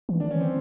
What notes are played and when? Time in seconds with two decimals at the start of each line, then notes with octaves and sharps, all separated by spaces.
0.09 E3
0.20 D#3 D4
0.31 E3 C#4
0.40 C4